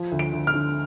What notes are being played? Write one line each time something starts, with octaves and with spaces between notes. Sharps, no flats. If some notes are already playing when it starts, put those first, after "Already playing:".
Already playing: F3
D2
D7
D2
F6
D3